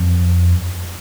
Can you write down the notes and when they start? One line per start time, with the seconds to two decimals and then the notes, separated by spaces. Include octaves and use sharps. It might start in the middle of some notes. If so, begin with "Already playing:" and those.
Already playing: F2